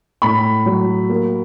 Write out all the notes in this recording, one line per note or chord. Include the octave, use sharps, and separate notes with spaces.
A2 B5
F#3
A#3